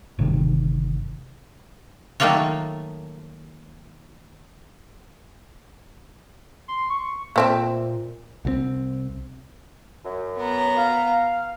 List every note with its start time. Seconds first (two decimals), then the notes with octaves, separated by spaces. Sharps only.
0.19 G1 C3 D#3
2.20 D#3 F#3 A3 A#3 F4 C#5
6.68 C6
6.90 C#6
7.36 A#2 A3 C4 E5
8.45 C2 E3 C4
10.05 F#2
10.38 B3 A#5
10.76 F5